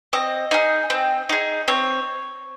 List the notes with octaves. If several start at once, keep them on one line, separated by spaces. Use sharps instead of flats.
C4 D#5
D#4 G#4
C4
D#4 G#4
C4 C#5